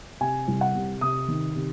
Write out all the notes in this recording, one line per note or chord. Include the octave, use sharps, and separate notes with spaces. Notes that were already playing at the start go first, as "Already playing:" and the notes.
C3 G#5
C2
F#5
C3
C3 D#6
D#3
C3